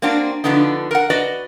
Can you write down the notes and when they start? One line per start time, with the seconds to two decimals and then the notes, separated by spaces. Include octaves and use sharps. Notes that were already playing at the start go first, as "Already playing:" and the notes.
0.02 A#3 C4 D4 F#4
0.44 D3 F3 B3 D4 D#4
0.91 A#4 F#5
1.10 F#4 B4 D5 D#5